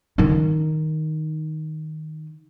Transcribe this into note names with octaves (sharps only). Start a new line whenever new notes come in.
D#3 D#4